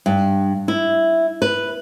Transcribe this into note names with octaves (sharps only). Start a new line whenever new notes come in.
G2
E4
B4